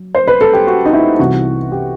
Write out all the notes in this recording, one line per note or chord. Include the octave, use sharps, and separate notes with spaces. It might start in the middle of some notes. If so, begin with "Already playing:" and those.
Already playing: F#3
C5
B4
A4
G4
F#4
D#4
E4
C2 C3 E3 F#4
G4